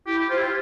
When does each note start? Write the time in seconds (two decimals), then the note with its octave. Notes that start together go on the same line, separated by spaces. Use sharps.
0.07 E4 G4
0.19 G4
0.29 F4 C5
0.33 E4 G4
0.42 F4